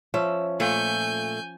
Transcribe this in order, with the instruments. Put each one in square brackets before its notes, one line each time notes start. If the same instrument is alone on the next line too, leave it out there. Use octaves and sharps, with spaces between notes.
[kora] F3 C#4 [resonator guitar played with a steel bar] E5
[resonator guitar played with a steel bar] A#2 A3 [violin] G#5 G6